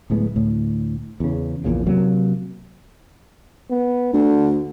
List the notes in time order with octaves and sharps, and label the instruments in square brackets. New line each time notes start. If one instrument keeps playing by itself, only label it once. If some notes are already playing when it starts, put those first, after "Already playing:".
[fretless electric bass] D1 A2 G#3 B3
D2 A2
E2 C#3
A#1 E2 A#2 C#3
C3 F#3 A#3
[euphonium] B3
[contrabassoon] D2 [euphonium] D3